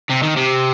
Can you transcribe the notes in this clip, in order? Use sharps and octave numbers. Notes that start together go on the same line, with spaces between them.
C3
D#3
C3